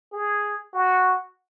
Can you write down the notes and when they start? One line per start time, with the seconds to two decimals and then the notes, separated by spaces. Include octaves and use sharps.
0.12 G#4
0.73 F#4